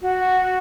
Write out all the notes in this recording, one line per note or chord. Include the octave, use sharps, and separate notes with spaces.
F#4